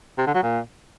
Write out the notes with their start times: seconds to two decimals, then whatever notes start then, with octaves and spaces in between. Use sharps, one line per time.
0.18 C3
0.26 D3
0.34 F#3
0.43 A#2